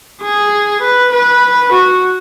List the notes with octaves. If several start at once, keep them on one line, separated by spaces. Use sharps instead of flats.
G#4
B4
B4
F#4